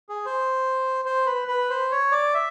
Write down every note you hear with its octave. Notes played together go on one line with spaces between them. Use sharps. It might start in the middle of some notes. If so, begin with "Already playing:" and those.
G#4
C5
C5
B4
B4
C5
C#5
D5
E5